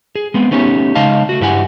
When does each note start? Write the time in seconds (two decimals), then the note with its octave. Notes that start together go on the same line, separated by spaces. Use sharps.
0.16 G#4
0.34 G#3 B3 C4
0.51 A3 B3 C#4 D#4 G4
0.95 C#3 G#3 D#4 D#5 F5 A5
1.29 A3 F#4
1.41 G2 E4 G4 F#5 G#5